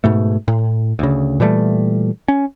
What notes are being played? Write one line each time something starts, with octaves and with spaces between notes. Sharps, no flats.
G#2 B2 A3
A2
D2 C#3
A#2 E3 G3 A3
C#4